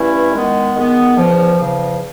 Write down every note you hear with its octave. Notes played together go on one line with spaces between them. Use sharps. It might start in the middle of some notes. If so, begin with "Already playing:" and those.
Already playing: G2 E3 A3 C#4 E4
D#3 G#3 B3
D#3 G#3 B3
E2 C#3 F3
E2 C#3 F3